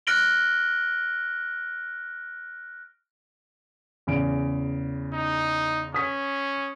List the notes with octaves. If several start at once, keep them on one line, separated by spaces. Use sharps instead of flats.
F6 F#6 A#6 D7 F#7 G7
E2 C#3 D7
D#4
C#4 D#6 B6